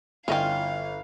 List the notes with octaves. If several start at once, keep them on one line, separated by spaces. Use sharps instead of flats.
G1 C#4 E4 F4 D#5 F5 G5